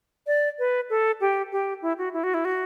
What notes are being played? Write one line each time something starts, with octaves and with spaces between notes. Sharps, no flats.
D5
B4
A4
G4
G4
E4
F#4
E4
F#4
E4
F#4